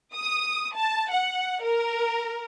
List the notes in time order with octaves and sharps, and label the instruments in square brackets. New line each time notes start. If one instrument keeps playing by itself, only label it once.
[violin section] D#6
A5
F#5
A#4